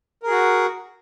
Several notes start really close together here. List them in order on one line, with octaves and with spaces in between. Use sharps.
A#4 G#4 F#4